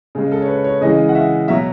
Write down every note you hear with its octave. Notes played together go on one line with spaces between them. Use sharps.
C#3 G#3
A4
C#5
B4
C#5
C#3 E3 G#3 D#5
F#5
E5
B2 F#3 E5